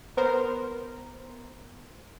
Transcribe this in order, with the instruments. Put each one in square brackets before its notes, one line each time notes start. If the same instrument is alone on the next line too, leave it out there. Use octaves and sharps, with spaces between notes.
[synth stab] B3 A#4 C5